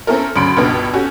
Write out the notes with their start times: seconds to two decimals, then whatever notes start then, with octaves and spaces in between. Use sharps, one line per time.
0.07 C4 C#4 E4 A4 A#4
0.36 D2 C#3 F#3 B5 C6 D7
0.57 C#2 G2 B2 B3
0.93 C#4 F#4 G4 A4